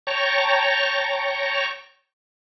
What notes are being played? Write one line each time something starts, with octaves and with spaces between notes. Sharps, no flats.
C#5 G5 A5 A#5 C#6